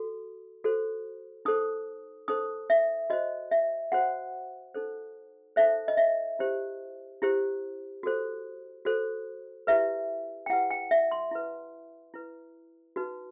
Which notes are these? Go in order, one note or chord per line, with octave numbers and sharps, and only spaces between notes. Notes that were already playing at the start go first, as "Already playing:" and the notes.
Already playing: F#4 A4
F#4 A4 C5
D#4 A4 C5 D#6
D#4 A4 C5 D#6
E5
F#4 C5 D#5
E5
F#4 C5 F#5
D#4 A4 C5
D#4 A4 C5 E5
D#5
E5
E4 G4 C5
E4 G4 C5
F#4 A4 C5
F#4 A4 C5
E4 G4 B4 E5
G5
E4 G4 B4 F#5
G5
E5
C6
E4 B4
E4 B4
D#4 F#4 B4